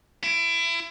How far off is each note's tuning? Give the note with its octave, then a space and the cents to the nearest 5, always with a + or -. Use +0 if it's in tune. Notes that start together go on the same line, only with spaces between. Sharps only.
E4 +30